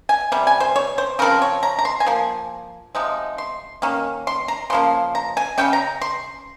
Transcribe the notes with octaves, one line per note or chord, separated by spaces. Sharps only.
G#5
C3 G3
G#5
C5
C#5
C5
C#3 F3 C4 A#4
C#5
A#5
A#5
C6
G#5
F3 A#3
C3 F3 G#3 D#4
C6
D#3 A#3 C#4
C6
A#5
C#3 F3 A#3 C6
A#5
G#5
C#3 G#3 C#4 G5
A#5
C6